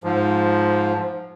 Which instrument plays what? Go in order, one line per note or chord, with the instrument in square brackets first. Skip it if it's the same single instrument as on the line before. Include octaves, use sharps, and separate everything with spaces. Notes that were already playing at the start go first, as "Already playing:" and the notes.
[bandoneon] G#2 F3